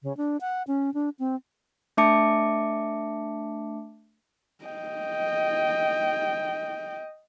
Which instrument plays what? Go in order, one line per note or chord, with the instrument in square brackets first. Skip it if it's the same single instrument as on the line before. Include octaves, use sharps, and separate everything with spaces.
[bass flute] C#3
D4
F#5
C#4
D4
C4
[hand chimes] A3 D4 E5 A5 D6 C#7
[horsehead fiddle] D#5 G5